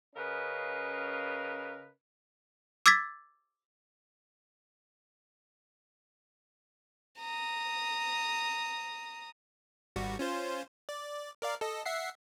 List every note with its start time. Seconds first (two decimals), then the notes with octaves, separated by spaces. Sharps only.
0.15 C#3 C#4 A#4 B4 D#5 F5
2.86 D6 E6 G#6 A6 B6
7.19 A#5 D#6
9.96 G#1 G3 F#4
10.19 C#4 F4 C5
10.89 D5
11.42 A#4 D5 F5
11.61 A4 D#5
11.86 E5 F#5 C7